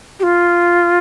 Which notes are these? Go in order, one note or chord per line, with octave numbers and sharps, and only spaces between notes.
G4
F4